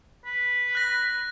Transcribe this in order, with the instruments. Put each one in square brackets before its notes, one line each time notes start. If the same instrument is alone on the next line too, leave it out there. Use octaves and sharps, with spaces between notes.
[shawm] B4
[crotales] F#6 A#6